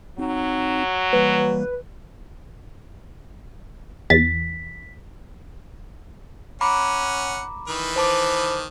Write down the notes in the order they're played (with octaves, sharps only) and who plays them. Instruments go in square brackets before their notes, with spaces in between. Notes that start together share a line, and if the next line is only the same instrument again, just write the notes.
[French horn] F#3 [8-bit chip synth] C4 D#4
[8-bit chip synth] E3 G3 A#3 [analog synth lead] B4
[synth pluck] E2 A6 [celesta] B6
[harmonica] C#4 F#5 [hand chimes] A#5 B5 D6
[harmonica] D#3 E3 B4
[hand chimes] C5 A5 D6